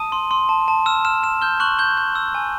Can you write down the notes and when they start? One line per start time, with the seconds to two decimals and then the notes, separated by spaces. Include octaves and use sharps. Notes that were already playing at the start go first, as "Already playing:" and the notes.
Already playing: A5 D#6 D#7
0.12 C6
0.31 C6
0.49 A5
0.68 A5
0.86 E6 F6 E7
1.05 E6 F6 E7
1.23 E6 F6 E7
1.41 F6 G6 G7
1.60 C#6 F#6 F#7
1.79 C#6 G6 G7
1.97 G6
2.15 E6
2.35 G#5